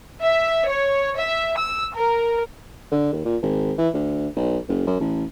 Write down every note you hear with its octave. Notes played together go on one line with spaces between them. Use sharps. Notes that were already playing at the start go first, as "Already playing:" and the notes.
E5
C#5
E5
E6
A#4
D3
D#2
A#2
G#1
E3
D2
B1
F#1
F#2
A1